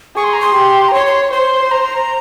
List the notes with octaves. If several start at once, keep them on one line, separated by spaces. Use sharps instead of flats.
G#4 C#6
C6
A#5
C6
G4
A#5
C#5 C6
C6
C5 C6
A#5